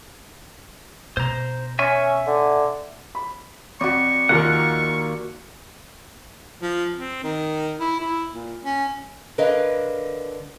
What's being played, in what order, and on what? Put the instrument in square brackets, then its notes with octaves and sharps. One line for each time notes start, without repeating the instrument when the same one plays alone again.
[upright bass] B2 [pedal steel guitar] C5 A#5
[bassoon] C#4 [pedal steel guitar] E5 G#5 C#6
[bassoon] D3
[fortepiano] B5
[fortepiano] F2 [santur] F#4 D5 [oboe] C#6
[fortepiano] D#2 F3 A#4 [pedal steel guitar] D#3 A#3 F#5
[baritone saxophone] F3
C4
D#3
E4
E4
A#2
C#4
[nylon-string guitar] D3 A#4 B4 C#5 D#5 F5